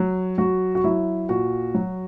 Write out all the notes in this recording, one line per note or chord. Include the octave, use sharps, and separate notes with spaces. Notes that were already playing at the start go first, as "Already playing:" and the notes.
Already playing: F#3
F#3 F#4
F#4
F#3 E4
A#2 F#4
F#3